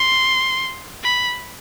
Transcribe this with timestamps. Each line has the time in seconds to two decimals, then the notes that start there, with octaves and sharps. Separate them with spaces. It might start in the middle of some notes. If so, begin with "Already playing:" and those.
Already playing: C6
1.03 B5